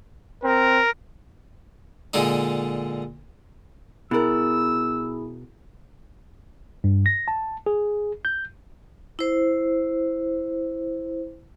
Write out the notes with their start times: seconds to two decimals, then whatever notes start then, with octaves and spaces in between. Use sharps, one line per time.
0.44 C4 A#4
2.14 A#2 D3 G#3 D#4
4.11 B2 E4 G#4 A#4 E6
6.84 G2
7.06 A#6
7.28 A5
7.66 G#4
8.25 G6
9.19 E4 C5